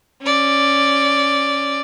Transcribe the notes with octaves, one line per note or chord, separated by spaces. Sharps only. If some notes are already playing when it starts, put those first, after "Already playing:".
C#4 D5